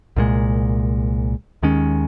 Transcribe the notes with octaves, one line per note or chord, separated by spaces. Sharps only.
C2 A#2 G#3
D#2 D#3 G#3 C#4